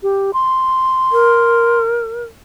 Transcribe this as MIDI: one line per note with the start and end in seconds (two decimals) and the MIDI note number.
0.03 0.31 67
0.34 1.79 84
1.12 2.24 70